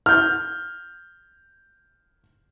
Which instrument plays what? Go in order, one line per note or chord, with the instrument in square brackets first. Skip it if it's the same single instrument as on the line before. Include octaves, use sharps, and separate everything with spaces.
[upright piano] F6 G6